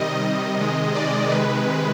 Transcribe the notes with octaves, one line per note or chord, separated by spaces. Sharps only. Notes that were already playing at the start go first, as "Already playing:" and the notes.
Already playing: C3 D#3 G3 D#5
D#5
C3 D#3 G#3
D5
C3 D#3 G#3 B4